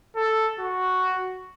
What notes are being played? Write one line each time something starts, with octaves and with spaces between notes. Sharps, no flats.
A4
F#4